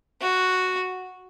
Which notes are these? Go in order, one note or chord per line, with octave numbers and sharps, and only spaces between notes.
F#4